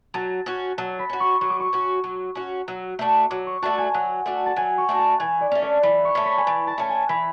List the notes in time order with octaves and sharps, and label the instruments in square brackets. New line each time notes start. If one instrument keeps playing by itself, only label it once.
[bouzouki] F#3 [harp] A5
[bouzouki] C#4 F#4
[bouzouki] F#3 [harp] A5
[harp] B5
[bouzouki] C#4 F#4
[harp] C#6
[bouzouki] F#3 [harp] C#6
[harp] D6
C#6
[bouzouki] C#4 F#4
F#3
C#4 F#4
F#3
A3 D4 F#4
[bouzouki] F#3 [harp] D6
[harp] C#6
[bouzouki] A3 D4 F#4 [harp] A5
[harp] G#5
[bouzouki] F#3 [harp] F#5
[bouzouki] A3 D4 F#4
[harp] A5
[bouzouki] F#3 [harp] G#5
[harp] C#6
[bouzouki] A3 D4 F#4
[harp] A5
[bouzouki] E3 [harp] G#5
[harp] D5
[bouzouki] A3 C#4
[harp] D5
[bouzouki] E3 [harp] B5
[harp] C#6
[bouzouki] A3 C#4
[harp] B5
G#5
[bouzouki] E3 [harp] A5
[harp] A5
[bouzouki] A3 C#4 [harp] A5
[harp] G#5
[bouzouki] E3 [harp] B5